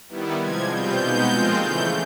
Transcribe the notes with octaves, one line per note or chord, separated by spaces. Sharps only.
D#3 G3 B3 E4
C3 F3 G#3 G#6
B2 G3 C4 F4 G6
B2 G#3 B3 D#4
A#2 F3 G#3 C4 F4
C#3 E3 A3 G6